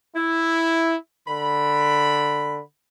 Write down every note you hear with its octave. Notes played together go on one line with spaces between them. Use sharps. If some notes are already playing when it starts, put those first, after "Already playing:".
E4
D3 B5